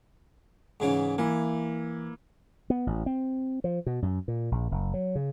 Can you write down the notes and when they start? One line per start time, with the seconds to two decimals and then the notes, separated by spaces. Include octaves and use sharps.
0.80 G#2 C#3 E3
1.18 E3 A#3 E4
2.70 B3
2.87 A1
3.06 C4
3.64 F3
3.86 B2
4.02 F#2
4.28 A#2
4.52 A#1
4.72 F#1
4.94 F#3
5.15 C#3